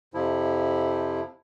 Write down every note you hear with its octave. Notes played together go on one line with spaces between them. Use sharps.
F2 C3 F3 E4